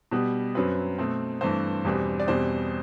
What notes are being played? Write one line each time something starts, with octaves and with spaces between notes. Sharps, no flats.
B2 G3 B3
F#2 F#3 C4 B4
B2 A3 C4
G2 E3 A3 C4 C5
E2 B2 G3 C4
D5
E2 B2 G3 C4 C5